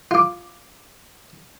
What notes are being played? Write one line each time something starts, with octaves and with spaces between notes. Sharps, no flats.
F4 D6